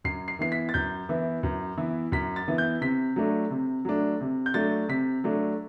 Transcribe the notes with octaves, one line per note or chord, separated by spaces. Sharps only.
F#2 C7
C7
E3 B3 E4 C7
B6
A6
F#2 G6
E3 B3 E4
F#2
E3 B3 E4
F#2 B6
A6
E3 B3 E4
G6
C3 B6
F#3 A3 D4
C3
F#3 A3 D4
C3
G6
F#3 A3 D4 A6
C3 B6
F#3 A3 D4